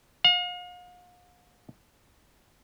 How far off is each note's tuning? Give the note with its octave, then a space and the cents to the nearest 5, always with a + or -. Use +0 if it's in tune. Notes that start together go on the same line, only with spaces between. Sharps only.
F5 +40